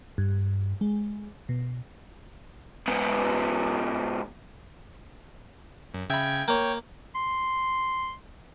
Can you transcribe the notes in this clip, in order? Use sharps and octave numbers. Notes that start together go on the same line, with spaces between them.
G2
G#3
B2
G#2 B3
F#2
C#3 E5 G5 B5 G#6
A#3 C#5 G5
C6